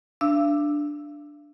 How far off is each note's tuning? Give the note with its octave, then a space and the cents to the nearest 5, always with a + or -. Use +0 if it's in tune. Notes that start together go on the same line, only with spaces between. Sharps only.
D4 +0 F5 -45 E6 +0